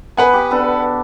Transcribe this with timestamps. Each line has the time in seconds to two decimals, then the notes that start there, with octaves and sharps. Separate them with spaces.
0.17 B3 B4 F#5 G#5
0.34 G4
0.51 B3 D4 A4